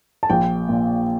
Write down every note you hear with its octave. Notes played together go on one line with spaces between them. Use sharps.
A5
A#1 G5
A#2